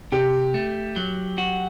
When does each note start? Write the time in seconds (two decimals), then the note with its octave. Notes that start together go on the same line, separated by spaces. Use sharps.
0.12 C3 G4
0.54 A3
0.96 F#3
1.38 F#4